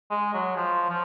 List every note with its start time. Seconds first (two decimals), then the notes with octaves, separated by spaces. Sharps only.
0.11 G#3
0.34 F#3
0.56 F3
0.90 F3